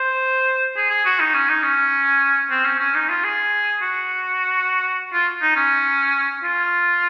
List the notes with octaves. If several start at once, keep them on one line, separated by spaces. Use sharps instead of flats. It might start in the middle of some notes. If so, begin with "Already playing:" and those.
Already playing: C5
G#4
G#4
F#4
D#4
C#4
D#4
C#4
C4
C#4
C#4
D#4
F4
G#4
F#4
F4
D#4
C#4
F4